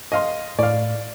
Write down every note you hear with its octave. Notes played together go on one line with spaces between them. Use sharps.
D#5 F5 C6
A2 D5 F5